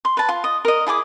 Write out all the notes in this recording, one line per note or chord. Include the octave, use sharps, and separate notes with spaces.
C6
B4 A5
F4
D#5
A#4 D#5
E4 G#4 G#5 D6